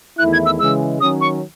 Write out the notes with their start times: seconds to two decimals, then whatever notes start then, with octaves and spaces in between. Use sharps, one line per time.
0.18 E2 D#3 A3 E4 F#6
0.33 G#6
0.46 E6
0.59 C#3 E3 G#3 E6
1.00 D#3 F#3 C#4 D#6
1.21 C#6